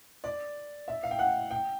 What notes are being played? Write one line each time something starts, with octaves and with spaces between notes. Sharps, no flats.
D5
E5
F5
G5
F#5
G5